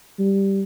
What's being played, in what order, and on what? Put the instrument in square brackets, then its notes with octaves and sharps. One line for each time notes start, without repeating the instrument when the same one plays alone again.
[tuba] G3